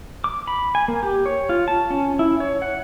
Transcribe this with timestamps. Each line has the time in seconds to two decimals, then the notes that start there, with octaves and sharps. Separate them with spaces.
0.24 D6
0.48 B5
0.75 G#5
0.88 A#3
1.03 G4
1.26 C#5
1.49 F4
1.68 A5
1.90 C#4
2.19 E4
2.40 C#5
2.62 F#5